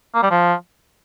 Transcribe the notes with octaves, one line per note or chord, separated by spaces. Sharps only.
A#3
G3
F3